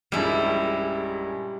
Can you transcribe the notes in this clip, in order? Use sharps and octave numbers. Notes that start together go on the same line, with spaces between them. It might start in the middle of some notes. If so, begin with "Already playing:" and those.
A#1 F#2 G3 G#3 E4